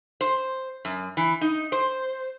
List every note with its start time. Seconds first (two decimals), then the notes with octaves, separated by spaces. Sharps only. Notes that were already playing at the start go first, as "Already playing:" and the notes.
0.21 C5
0.85 F#2
1.17 E3
1.41 D#4
1.72 C5